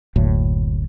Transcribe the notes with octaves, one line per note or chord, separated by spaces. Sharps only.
F#1 D2 A2